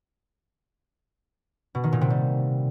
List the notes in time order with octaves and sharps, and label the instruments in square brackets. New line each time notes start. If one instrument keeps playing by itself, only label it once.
[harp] B2
D#3
A#2
C3
G3